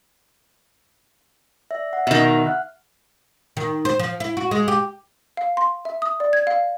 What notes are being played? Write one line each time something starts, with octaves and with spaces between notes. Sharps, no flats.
D5 E5
F#5
B2 D#3 E5 F#5
F#5 F6 F#6
D#3
C5
F3
E4
F#4
G#3
G4
F5
C6
E5
D#6
D5
G#6
F5